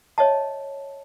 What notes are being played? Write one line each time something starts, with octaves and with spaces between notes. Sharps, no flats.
C#5 D#5 E5 A5